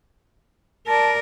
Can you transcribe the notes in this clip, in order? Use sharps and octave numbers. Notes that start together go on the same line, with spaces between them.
A#4 D5 A5